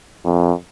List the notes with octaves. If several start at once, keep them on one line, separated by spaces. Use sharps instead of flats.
F2